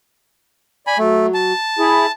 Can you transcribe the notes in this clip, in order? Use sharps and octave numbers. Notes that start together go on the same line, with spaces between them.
D5 G#5 B5
F#3 A3
A5
E4 G#4